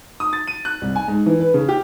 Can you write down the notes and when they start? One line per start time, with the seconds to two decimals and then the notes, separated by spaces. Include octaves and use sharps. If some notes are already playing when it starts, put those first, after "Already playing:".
0.20 D#6
0.33 A6
0.47 D#7
0.65 F#6
0.82 C2
0.96 G#5
1.08 G#2
1.26 E3
1.40 B4
1.54 C#3
1.68 G4